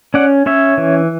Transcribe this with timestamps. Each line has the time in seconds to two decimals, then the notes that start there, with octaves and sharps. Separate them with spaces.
0.14 C#4 D5 F#5
0.46 C#4 C#5 E5
0.78 E3